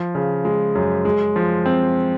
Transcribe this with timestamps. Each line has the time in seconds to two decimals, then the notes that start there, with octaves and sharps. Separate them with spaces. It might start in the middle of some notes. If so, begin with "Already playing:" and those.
Already playing: F3
0.15 C#3
0.45 G#3
0.75 F#2
1.05 G#3
1.36 F3
1.66 C4